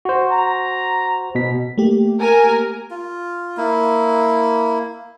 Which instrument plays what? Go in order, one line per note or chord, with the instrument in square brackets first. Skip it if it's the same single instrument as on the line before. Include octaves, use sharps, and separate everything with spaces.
[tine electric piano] F#4 C5
[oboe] A#5
[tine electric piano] B2 B6
[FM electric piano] A3 A#3 G4
[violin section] A#4 G#5
[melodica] F4
A#3 E4